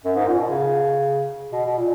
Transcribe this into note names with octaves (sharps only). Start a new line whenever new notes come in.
F#2
G#2
A#2
B2
C#3
B2
B2
A#2